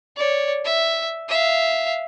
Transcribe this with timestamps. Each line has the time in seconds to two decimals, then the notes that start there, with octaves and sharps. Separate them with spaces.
0.17 C#5 D5
0.65 E5
1.29 E5 F5